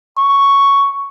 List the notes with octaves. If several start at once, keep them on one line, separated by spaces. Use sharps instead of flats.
C#6